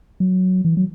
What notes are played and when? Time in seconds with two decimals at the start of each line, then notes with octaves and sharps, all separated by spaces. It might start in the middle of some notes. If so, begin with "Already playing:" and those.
0.20 F#3
0.65 E3
0.77 F#3